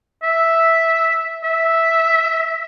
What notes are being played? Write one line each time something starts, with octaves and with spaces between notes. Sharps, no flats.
E5
E5